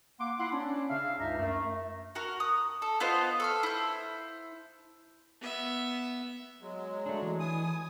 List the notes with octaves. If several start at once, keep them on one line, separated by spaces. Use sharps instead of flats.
A#3 F#5 C6 D6
E4 F#5 C6
C#4 D4 E4
C#3 E5 F5
C#2 G2 D4 D#4 E5 A#5
F#2 A3
F#4 A#4
D#6
A4
B3 F4 C5 D#5
A4 C#6 F6
E4 C5
B3 E5
F#3 G#3
A3 D4
E3
G#5 D#6